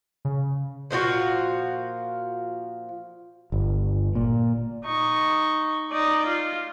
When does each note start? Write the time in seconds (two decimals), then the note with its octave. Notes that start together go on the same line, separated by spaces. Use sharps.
0.25 C#3
0.91 A#2 F3 F4 F#4
3.52 G1
4.15 A#2
4.84 D#4 C#6
5.91 D#4 D5
6.26 F4